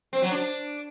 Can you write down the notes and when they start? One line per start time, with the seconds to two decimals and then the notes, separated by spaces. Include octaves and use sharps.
0.13 C4
0.22 F#3
0.31 D4